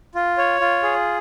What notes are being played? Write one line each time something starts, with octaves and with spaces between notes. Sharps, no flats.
F4
C#5
F4
G#4